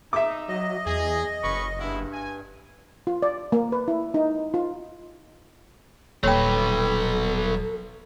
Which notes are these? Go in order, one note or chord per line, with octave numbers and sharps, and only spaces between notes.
D#4 E5 D6
F#3 D#5
E2 G#4
F#1 C#4 B4 C#6
G2 G#3 B3 E4
G#5
F4
D5
A#3
B4
E4
D#4
F4
D#1 F#3 A4 B4 C#5 G5